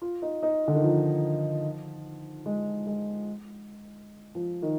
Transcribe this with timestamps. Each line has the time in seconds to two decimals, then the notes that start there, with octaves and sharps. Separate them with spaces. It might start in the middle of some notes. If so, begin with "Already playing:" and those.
0.01 F4
0.22 D#4
0.43 D#4
0.68 D3
0.75 D#3
0.83 F3
2.46 G#3
2.87 G#3
4.35 F3
4.62 D#3